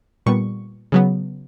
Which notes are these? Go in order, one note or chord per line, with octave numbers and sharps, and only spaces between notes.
A#2 G3 B3 C#6
C#3 F#3 B3